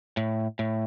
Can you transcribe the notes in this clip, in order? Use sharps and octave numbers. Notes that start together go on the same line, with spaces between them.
A2
A2